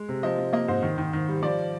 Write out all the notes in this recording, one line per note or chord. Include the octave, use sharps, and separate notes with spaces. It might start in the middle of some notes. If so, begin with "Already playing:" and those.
Already playing: G#3
C3
F3 D#5
F3
A#3 D#5
G#2 C5
D#3
D#3
D#3
G3
F3 D5